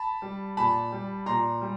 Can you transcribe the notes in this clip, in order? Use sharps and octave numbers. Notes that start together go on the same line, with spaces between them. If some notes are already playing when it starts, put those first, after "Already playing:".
Already playing: A5 B5
G3
A#2 A5 B5
G3
A#2 A#5 C6
G3